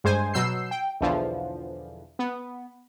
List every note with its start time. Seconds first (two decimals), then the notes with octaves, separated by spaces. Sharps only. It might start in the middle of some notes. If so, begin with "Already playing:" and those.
0.04 G2 G#3 C5 G#5
0.34 B2 F#3 E6 G6 C7
0.71 G5
1.01 B1 E2 D3 E3 F3
2.19 B3